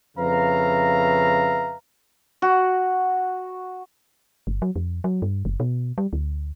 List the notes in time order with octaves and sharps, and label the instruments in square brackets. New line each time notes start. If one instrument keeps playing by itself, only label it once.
[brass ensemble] F2 C#3 B4 E5 F5 A#5
[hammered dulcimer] F#4
[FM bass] G1
F#3
F2
F#3
G2
F#1
B2
G3
D2